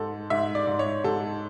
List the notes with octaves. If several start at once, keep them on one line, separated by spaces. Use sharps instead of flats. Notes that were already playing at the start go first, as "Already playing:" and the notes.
Already playing: G#2 A4
G#2 E5
D5
G#2
C#5
G#2 A4